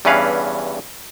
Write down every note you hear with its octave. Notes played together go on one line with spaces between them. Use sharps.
E2 G2 E3 C#4 B4 F5